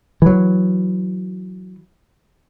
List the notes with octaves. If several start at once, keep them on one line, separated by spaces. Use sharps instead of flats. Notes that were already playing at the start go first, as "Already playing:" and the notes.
E3 F#3